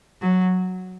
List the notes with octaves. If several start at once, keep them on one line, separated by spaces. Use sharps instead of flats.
F#3